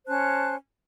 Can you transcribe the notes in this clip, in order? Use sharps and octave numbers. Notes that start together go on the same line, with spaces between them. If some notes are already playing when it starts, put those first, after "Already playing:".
C#4 C5 A5 F#6